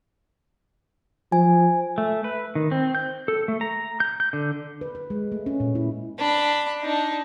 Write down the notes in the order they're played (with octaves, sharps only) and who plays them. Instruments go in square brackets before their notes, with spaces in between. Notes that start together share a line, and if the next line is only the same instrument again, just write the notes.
[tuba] F3 [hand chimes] G#5
[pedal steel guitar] A3
B4
D#3
C4
G6
A4
A3
A#5
G6
G6
D3
[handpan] B4
B4
G#3
A3
C#4
A#2
E4
[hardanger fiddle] D4 B5
D4 D#4